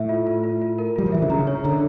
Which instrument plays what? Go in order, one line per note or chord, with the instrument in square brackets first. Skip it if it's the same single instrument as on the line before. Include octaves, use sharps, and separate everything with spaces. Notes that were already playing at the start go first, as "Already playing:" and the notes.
Already playing: [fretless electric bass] A2 [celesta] E5
[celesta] F4
F4
F4
F4
A#4
[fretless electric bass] G3 [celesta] F4
[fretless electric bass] F3
[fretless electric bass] E3 [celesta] E5
[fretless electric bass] D3
[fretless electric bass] C#3 [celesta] A#5
[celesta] C#5
[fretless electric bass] D3 [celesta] A#5